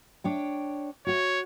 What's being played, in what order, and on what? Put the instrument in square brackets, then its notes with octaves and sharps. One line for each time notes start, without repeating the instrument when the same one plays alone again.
[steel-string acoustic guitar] D4 C#5 G5
[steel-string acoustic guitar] F#4 F#5 [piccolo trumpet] C#5